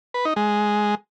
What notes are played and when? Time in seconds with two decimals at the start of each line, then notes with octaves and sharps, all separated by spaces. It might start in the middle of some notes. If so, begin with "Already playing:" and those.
0.14 B4
0.25 D#4
0.36 G#3